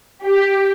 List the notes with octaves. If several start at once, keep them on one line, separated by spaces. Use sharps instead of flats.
G4